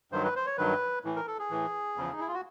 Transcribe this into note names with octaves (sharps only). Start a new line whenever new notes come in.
G2 D#3 F#3 C5
B4
C5
C#5
G2 D#3 F#3 B4
A2 E3
A#4
A4
G#4
A2 E3
E2 C#3 F3
D#4
E4
F4
F#4